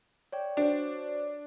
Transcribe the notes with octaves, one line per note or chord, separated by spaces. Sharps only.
C#5 D5 G5
D4 F#4 C5 C#5